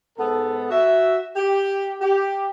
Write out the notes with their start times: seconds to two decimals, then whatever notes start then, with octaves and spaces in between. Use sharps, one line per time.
0.18 G#2 B3 A4
0.71 F#4 E5
1.36 G4
2.01 G4